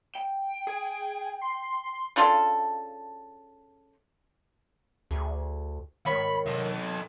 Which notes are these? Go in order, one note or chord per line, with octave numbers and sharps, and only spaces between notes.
G5
G#4
C6
C#3 D4 F4 A4
D2 G#4
G#2 D#3 C#5 B5
D#4 A4